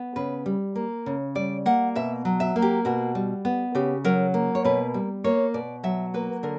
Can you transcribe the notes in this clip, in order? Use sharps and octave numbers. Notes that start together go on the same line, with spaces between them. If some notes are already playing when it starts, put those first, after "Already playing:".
Already playing: B3
C#3 B4
G3
A#3
C#3
G3 D5
A#3 F#5
B2 E5
F#3
E5
A#3
G4
B2 F#4
G3
B3
C#3 G4
F#3 A#4
A#3
C#5
B2 B4
G3
A#3 C#5
B2 D5
F#3 E5
A#3 B4
D3 A#4